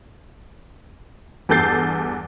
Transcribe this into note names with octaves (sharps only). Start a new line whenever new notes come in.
E2 G2 A4 G6 A6 C7